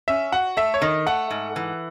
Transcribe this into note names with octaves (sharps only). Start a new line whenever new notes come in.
C#4 E5
F#4 F#5
A3 E5
C#5
D#3 D#5
A3 F#5
G#2
E3